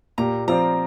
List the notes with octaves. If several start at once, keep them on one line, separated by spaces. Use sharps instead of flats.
A#2 A#3 G4 A#5
F3 C4 F4 D5 A#5